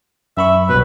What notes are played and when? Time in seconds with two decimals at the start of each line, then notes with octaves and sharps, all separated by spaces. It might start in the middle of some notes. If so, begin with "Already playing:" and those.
0.37 F#2 E5 B5 C#6
0.69 C2 B2 B4